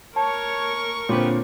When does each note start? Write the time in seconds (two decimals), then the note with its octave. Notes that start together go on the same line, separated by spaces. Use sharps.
0.16 A#4 C#5 A5 C#6
1.09 A#2 D3 B3 C4 G4 B4 C#5